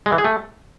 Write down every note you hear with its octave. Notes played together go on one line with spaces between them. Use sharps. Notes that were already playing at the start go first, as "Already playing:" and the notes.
G#3
E3
G#4
A3